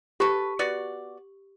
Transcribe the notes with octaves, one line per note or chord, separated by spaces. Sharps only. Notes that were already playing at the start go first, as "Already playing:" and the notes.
G4 A4 B4 C#6
B3 F#4 D5